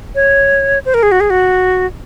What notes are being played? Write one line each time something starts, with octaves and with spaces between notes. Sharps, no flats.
C#5
C5
A#4
G#4
F#4
G#4
F#4